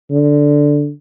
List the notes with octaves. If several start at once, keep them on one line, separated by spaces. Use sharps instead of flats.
D3